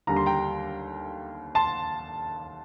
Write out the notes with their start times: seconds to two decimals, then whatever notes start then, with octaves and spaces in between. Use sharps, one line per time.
0.07 D#2 D3 G3 A#5
0.17 C6
0.26 G5 A#5
1.55 A5 C6